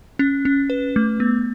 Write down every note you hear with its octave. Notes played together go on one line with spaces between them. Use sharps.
C#4
C#4
B4
A3
B3